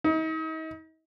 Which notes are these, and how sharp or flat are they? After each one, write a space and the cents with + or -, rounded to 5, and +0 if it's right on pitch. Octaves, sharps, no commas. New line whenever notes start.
D#4 +40